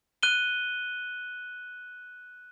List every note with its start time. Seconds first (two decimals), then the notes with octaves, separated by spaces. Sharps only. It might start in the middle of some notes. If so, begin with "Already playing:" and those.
0.23 F#6 D#7 G7